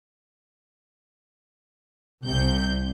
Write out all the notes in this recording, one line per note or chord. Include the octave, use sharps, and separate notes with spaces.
C2 C3 G6